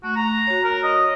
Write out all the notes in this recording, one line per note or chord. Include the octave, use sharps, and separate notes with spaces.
A3 F#4
A#5
F#4 C#5
A#4
D#5